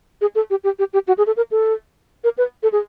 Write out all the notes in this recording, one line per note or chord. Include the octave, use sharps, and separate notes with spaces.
G#4
A4
G4
G4
G4
G4
F#4
G#4
A4
A#4
A4
A#4
B4
A4
G#4